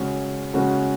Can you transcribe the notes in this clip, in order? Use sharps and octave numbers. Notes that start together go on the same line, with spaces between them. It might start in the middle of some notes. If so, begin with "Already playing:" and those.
Already playing: C#3 G#3 C#4 F#4
C#3 G#3 C#4 F#4